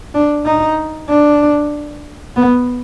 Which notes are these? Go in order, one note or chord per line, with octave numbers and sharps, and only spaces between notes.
D4
D#4
D4
B3